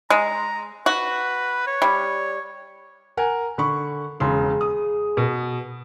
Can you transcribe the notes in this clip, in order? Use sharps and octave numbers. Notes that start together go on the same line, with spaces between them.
G#3 A#5
F#4 B4
C#5
G3
A#4 F#5 G#5
D3 B5 C#6
E1 C#3 G#4 C6
D#6
B2